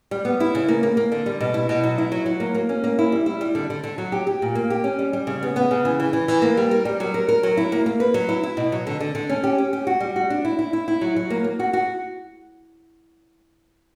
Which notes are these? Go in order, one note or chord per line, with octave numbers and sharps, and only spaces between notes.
G3
B3
E4
C#3
A#3
A#3
A#3
D3
G3
B2
E4
B2
F#3
E4
F#3
F#3
A#3
A#3
C#4
A#3
E4
G3
E4
G3
D3
D3
D3
F#3
G4
G4
A#2
A#3
G4
C#4
G3
G3
C#3
B3
B3
C#3
E3
E3
E3
E3
A#3
G3
A#4
G3
F#3
A#4
A#4
F#3
E4
A#3
A#3
B4
F#3
E4
E4
B2
F#3
D3
D3
D3
C#4
G4
C#4
G4
F#4
G3
F#4
D4
E4
E4
E4
E4
F#3
F#3
A#3
A#3
F#4
F#4